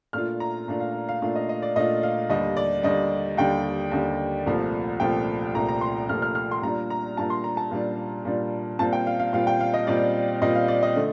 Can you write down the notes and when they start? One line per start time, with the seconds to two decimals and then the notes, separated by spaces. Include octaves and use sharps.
0.13 A#2 A3 D4 F4 F6
0.40 A#5
0.68 A#2 A3 D4 F4
0.80 F5
1.09 F5
1.22 A#2 A3 D4 F4
1.35 D#5
1.49 D#5
1.62 D5
1.76 A#2 A3 D4 F4 D#5
2.03 F5
2.29 D#2 D3 G3 D#5
2.57 D5
2.83 D#2 D3 G3 D#5
3.37 D#2 D3 G3 G5
3.92 D#2 D3 G3
4.46 C2 A#2 F3 A3
5.00 C2 A#2 F3 A3 G5
5.54 C2 A#2 F3 A3 A#5
5.69 A#5
5.81 C6
6.09 C2 A#2 F3 A3 F6
6.22 F6
6.35 F6
6.51 C6
6.62 A#2 G3 D4 F4 A#5
6.90 A#5
7.16 A#2 G3 D4 F4 A5
7.30 C6
7.44 A#5
7.57 A5
7.71 A#2 G3 D4 F4
8.25 A#2 G3 D4 F4
8.79 A#2 G3 C4 F4 A5
8.93 G5
9.07 F5
9.20 F5
9.33 A#2 G3 C4 F4 F5
9.47 G5
9.60 F5
9.74 D#5
9.87 A#2 G3 C4 F4 D5
10.42 A#2 G3 C4 F4 D#5
10.55 F5
10.68 D5
10.83 D#5
10.96 D3 A3